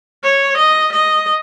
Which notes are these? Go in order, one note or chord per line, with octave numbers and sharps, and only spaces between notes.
C#5
D#5
D#5